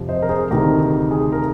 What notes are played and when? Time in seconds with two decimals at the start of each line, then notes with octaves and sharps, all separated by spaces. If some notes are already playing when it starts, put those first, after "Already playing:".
Already playing: F2 C3 F3
0.09 C5 D#5
0.22 A#4
0.29 G#4 C5
0.51 D2 C3 D#3 G4 A#4
1.11 G#4
1.32 A#4